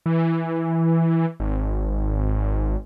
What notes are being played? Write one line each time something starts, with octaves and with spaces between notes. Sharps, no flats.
E3
G#1